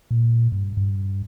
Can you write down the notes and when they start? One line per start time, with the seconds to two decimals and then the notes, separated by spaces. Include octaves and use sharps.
0.11 A#2
0.52 G2
0.77 G2